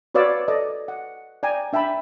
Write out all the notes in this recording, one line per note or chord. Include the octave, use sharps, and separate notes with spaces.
F#4 B4 C#5 D5 F5 E6
A4 D5 D#5
F#5
D5 G5 G#5 A#5
D4 E5 G5 A5 B5